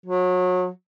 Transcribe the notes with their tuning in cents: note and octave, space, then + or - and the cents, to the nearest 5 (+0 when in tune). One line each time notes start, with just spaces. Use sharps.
F#3 -30